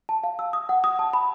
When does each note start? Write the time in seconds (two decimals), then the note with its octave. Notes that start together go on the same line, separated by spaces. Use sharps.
0.09 A5
0.24 F5
0.39 E6
0.53 D#6
0.69 F#5
0.84 D#6
0.99 A5
1.13 B5